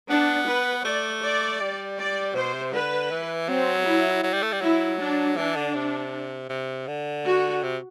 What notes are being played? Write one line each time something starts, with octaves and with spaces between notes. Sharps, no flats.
B3 D4
B4
A3 D5
D5
G3
D5
B2 C5
C3
D3 B4
E3
F#3 C4
E4
F#3
G3
A3
G3
F#3 E4
D4
E3 D4
D3
C3
C3
D3
F#4
C3